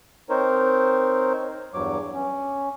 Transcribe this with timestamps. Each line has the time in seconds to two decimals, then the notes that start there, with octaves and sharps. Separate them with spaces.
0.30 C4 D#4 A#4 C5 C#5
1.74 E2 G2 F#3 C#5 D6
2.14 C#4